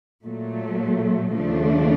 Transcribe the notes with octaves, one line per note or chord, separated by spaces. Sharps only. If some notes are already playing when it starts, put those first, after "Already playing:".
A#2 F#3 A3
D#2 C#3 F3 A3 D4